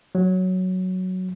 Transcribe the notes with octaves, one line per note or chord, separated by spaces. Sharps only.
F#3